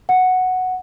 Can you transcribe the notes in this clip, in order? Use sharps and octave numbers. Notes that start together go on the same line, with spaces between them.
F#5